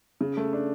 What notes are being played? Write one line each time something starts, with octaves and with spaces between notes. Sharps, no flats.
C#3
A3
D4